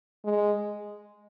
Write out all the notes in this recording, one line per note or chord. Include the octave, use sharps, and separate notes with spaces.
G#3